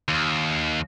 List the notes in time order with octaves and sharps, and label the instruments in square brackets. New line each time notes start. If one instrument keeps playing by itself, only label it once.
[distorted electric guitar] D#2